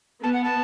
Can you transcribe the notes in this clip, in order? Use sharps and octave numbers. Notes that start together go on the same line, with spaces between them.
B3 A5
F#5
A5